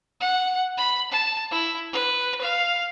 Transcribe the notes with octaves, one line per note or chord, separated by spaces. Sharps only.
F#5
B5
A5
E4
B4
F5